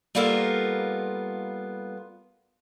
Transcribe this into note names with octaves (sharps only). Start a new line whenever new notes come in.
G3 A#3 B3 F4 A4 A#4